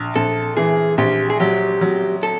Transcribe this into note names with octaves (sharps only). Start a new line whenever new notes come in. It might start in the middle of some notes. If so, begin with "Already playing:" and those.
Already playing: A#1
A#1 A4
E3 G#4
A#1 G4
G#4
F#3 G4
F#3
A4